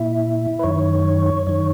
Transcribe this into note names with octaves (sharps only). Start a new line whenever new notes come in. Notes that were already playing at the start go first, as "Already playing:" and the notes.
Already playing: A#2 E4
B4
F#2 D#3 C#5
F#2 D#3 C#5